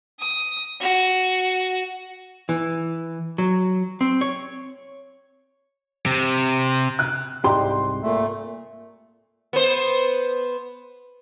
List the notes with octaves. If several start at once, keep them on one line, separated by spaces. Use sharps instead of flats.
D#6
F#4
E3
F#3
C4
C#5
C3
F#6
C2 G#2 G4 C6
A#2 A3
B3 C5